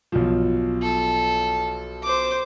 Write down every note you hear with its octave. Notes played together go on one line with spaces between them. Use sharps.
B1 F3
A4
C5 D6